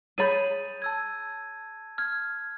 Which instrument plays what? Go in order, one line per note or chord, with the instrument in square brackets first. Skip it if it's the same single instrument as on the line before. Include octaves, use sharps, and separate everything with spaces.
[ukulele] G#4 C#5 B5 [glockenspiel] G6 A6 D#7
[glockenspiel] A5 E6 G#6
F6 G#6